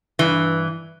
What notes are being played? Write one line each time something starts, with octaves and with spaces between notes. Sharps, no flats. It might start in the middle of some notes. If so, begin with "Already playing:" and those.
G2 E3